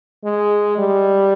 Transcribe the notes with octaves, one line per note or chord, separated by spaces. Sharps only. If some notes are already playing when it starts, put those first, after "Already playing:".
G#3
G3